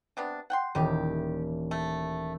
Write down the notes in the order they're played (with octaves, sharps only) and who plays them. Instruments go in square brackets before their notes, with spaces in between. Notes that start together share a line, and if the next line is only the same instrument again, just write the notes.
[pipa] C3 B3 D4
F#5 G5 C6
[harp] D#1 E3 [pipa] D#3 D#4 G4
[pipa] A3